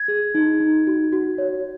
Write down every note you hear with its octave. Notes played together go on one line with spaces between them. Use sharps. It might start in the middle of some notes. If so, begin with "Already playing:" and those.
Already playing: G#6
G#4
D#4
D#4
F#4
F#4
C#5